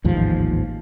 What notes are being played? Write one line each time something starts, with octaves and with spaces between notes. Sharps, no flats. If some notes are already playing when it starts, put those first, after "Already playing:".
A1 D#2 G#2 F3